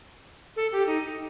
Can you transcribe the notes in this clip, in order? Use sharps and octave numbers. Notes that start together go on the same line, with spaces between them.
A4
G4
D#4